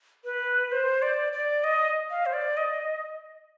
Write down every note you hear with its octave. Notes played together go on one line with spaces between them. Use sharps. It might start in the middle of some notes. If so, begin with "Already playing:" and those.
B4
C5
D5
D5
D#5
F5
C5
D5
D#5